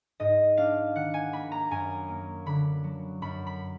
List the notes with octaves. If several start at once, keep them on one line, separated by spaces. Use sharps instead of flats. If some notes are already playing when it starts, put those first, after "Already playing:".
G#2 D#5
D4 F5
D#3 F#5
G#5
A#3 B5
A#5
F#2 G#5
A#3
D3 B5
F#3
F#2 B5
B5